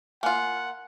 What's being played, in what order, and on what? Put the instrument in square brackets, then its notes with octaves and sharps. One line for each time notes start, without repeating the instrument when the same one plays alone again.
[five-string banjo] A#3 F4 [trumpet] F#5 [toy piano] G#5